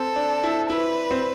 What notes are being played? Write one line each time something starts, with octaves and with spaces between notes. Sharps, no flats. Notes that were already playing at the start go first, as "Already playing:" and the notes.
Already playing: C4 A4
D4
E4
E4 B4
C4